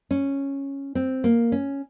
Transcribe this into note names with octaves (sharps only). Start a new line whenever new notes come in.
C#4
C4
A#3
C#4